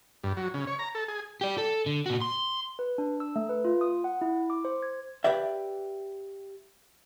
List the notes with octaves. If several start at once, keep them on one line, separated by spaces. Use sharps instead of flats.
G2
F#3
C#3
C#5
A#5
A4
G#4
G4 D5
A4
D3
A#2 F#4
C6
B4
D4
E6
A3
B4
F4
D#6
F#5
E4
D6
C5
G#6
G4 B4 D5 E5